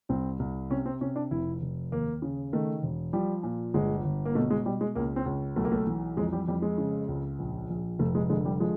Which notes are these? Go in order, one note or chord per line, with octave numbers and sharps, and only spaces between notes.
C2 C4
C2
C3 C#4
C4
C3 C#4
D4
F1 E4
F1
D#2 A#3
C#3
D#3 A3
E1
F3 G3
A#2
G1 G#3
G1
A#3
B2 A3
G#3
B2 G3
G#3
C#2 A#3
C4
C#2
B1 A3
A#3
A3
E3
F2 G#3
G3
F2 G3
G#3
C#3
C#2
A#1
A#1
F1 A3
G#3
D3 G#3
G3
F3 G#3